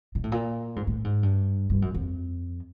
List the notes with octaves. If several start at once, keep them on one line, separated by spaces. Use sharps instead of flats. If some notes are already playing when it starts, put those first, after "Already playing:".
A#2
A2
A#2
G#2
A2
G#2
G2
G2
F#2
F2